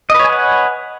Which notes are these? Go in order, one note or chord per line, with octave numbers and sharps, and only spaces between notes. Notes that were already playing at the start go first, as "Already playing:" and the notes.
B4 C#5 D#5 F#5 G#5